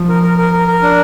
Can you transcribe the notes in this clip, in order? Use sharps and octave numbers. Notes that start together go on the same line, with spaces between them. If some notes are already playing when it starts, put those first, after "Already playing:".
Already playing: F3
A#4
A#4
A#4
A#4
A#4
D4